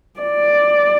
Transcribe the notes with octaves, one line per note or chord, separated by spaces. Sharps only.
D5